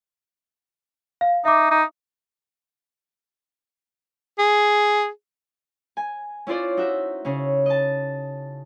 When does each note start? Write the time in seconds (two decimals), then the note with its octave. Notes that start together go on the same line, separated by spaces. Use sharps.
1.21 F5
1.45 D#4 E5 D6
1.71 D#4
4.39 G#4
5.97 G#5
6.47 C#4 E4 F4 C5 D5
6.77 D#4 F#4 E5
7.25 C#3 C#4
7.66 D#5 A5